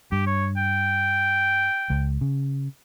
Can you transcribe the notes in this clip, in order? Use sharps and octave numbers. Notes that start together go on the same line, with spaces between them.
G2 G4
C#5
G5
C#2
C#3